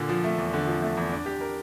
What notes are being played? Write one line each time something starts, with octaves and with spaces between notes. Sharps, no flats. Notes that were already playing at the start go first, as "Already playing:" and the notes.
Already playing: A#2 D3
F3
A3
E2
D3
F3
A3
E2
D4
G4
A#4